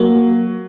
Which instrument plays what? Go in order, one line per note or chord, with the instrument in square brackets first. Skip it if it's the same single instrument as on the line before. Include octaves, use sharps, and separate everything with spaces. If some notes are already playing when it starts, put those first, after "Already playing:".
Already playing: [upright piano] F#3 [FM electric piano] A#3